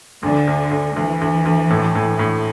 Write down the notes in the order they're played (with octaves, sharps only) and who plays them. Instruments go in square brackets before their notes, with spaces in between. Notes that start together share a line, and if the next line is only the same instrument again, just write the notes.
[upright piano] D2 [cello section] D3
[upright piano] D2
D2
[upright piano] D2 [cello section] E3
[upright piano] D2
D2
A2
A2
A2